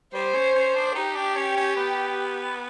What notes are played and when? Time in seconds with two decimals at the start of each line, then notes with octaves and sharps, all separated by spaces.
0.14 G3 C5
0.34 C#4
0.55 C#4
0.75 D4
0.95 D#4 G4
1.15 D4
1.36 C#4
1.57 C#4
1.76 B3